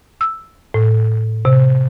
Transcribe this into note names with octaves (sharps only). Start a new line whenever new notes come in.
E6
A2
C3